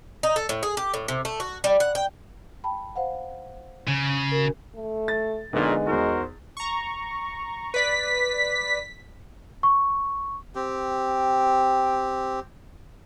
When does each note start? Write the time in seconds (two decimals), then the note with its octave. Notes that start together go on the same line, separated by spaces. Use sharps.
0.23 D#4
0.36 A4
0.49 A2
0.63 G#4
0.77 G4
0.94 A2
1.08 C3
1.25 A3
1.40 F#4
1.64 G3
1.80 F#5
1.95 G5
2.64 G5 A5 B5
2.96 C5 F5 F#5
3.87 C#3
4.32 F#4 A#4
4.76 A3
5.08 A6
5.53 A#1 A#2 D3 G#3 B3 D#4
5.87 E2 D#4 F#4 A#4 C5
6.57 A#5 C#6
7.74 B4 D5 B6
9.63 C#6
10.55 C4 G4